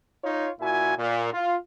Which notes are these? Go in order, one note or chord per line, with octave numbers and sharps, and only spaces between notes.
D#4 F4 C#5
A#2 E4 F#4 G#5
A#2
F4